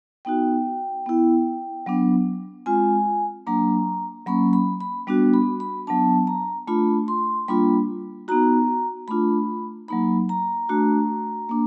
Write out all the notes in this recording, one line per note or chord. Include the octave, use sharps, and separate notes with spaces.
B3 D#4 F#4 G5
B3 E4
F#3 B3 D4
G#3 C4 F4 G#5
F#3 A#3 D4 A#5
F#3 A#3 C#4 B5
B5
B5
G3 B3 D4 F#4
B5
B5
F#3 B3 D4 A5
A#5
A3 D4 F4 B5
C6
G3 A#3 D4 F4 B5
B3 D#4 F#4 A#5
A3 D4 F4 B5
F#3 A#3 D#4 B5
A#5
A3 D4 F#4
A#3 D4